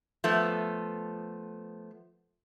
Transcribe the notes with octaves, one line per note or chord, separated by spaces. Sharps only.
F3 A3 B3